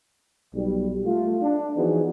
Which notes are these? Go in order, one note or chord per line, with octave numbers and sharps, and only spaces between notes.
B1 G3
A3 F4
D4
E3 F3 B3 D#4 F#4 G#4